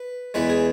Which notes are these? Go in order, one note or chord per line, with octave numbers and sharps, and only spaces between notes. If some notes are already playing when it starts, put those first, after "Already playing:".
Already playing: B4
E2 E3 G#3 B4
G#4